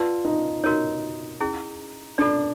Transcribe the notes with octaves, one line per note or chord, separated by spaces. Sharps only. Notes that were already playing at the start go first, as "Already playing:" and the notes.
Already playing: F4 B4 D5 F#5 A5
D#4
D#4 F#4 A#4 C#5
C#4 E4 G#4
D4 F4 A4 D5